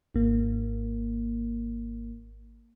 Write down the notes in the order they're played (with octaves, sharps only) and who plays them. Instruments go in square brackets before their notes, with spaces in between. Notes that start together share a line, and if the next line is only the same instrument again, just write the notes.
[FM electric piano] G#1 A#3